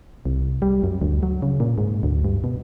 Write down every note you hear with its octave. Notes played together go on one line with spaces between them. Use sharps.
C2
G3
F#2
D2
F#3
C#3
A#2
G#2
D2
G2
B2